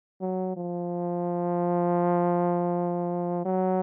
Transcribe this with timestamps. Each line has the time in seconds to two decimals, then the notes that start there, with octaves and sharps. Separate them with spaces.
0.21 F#3
0.57 F3
3.46 F#3